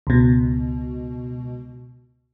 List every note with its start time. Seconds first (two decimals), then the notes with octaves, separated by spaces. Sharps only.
0.07 C#2 B2